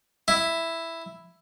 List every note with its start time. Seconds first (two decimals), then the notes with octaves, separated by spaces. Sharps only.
0.28 E4